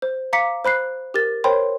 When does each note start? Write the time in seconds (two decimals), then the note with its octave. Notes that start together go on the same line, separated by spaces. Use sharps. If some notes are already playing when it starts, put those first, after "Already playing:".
0.02 C5
0.33 F5 A#5 D6 B6 C#7
0.65 C5 B5 F#6 C7
1.14 G4 A#4 A6
1.44 A#4 C5 C#5 G5 B5 C6